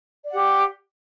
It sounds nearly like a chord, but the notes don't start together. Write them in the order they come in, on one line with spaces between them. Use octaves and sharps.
D5 F#5 G4